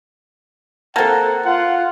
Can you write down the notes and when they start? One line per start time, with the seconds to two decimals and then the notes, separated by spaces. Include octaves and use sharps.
0.96 A#3 C4 A4 F#5 A5
1.45 F4 F#5